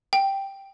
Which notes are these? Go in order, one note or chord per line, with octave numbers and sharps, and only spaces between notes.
G5